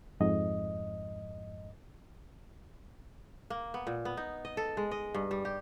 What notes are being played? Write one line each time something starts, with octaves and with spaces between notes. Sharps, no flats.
F2 G#2 D#5
A#3
B3
A#2
B3
D#4
D#5
A4
G#3
D#5
G2
G3
G4